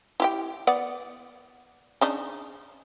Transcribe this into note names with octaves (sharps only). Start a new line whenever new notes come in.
E4 G4 G5
B3 D5 F#5
C#3 D4 D#4